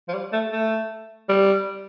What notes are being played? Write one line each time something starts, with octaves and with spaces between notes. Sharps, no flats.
F3
G3
A3
A3
G3